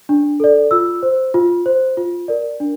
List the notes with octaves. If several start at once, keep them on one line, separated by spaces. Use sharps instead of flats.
D4
A4 D5
F4 E6
C5
F4
C5
F4
A#4 D5
D4